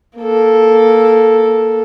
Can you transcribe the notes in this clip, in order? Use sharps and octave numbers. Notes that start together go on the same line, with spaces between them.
A#3 A4